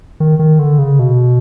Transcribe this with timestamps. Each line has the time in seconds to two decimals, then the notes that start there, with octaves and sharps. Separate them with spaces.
0.20 D#3
0.39 D#3
0.59 D3
0.79 C#3
0.99 B2